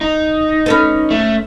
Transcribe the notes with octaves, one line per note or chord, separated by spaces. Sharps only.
D#4
C#4 A4 B4
A3